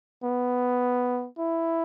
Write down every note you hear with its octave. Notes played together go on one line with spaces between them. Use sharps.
B3
E4